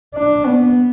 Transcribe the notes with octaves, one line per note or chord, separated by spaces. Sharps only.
D4
B3